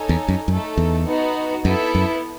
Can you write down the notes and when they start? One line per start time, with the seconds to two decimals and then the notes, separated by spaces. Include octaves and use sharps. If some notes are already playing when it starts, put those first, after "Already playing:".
Already playing: D#4 A4 C#5 G#5
0.09 E2
0.29 F#2
0.48 F#2 A3 D#4 A4
0.77 E2
1.07 B3 D#4 F#4
1.65 F#2 B3 E4 A4
1.95 F#2